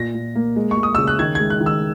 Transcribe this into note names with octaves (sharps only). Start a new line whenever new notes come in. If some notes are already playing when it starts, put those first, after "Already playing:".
Already playing: A#2 A#6
A#2
A#3
G#3
C#6
G#3
D#6
C#3 E6
F#6
D#3 G#6
G#6
G#3
F#6
D#3
E6